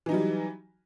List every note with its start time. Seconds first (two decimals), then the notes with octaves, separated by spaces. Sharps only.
0.06 E3
0.09 D#4
0.11 F#3
0.14 G3